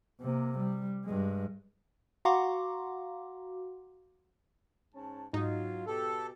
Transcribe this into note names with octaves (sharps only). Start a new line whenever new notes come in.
C3 A#3
G3
G2 G#3
F#4 F5 F#5 A#5 C6 D6
G#2 C#4 A5
G#2 F#3 D#4 F4
B2 G4 A4